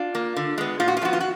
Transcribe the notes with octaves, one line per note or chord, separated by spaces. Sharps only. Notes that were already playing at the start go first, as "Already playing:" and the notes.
Already playing: D4 F4
A#3
D3
G#3 B3
A#2 F4
F#4
F4
F3 G#3 B3 F#4
F4
F#4